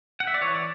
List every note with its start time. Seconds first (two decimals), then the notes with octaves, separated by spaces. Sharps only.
0.20 F#5
0.27 E5
0.34 D5
0.41 E3 C#5
0.55 D5